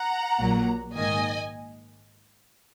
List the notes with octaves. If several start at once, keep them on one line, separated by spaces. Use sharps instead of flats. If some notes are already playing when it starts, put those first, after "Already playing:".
Already playing: F#5 A#5
A#1 A#2 F#3 A#3
G#2 D#3 A#3 D#5 G#5